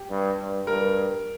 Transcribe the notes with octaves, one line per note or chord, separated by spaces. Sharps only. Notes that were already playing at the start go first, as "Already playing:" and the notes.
Already playing: G4
G2
G2
G2 A#4